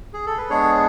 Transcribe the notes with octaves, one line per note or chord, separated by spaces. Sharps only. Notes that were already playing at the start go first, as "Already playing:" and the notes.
G#4
A4
B4
G#3 B3 D4 G#4 C#5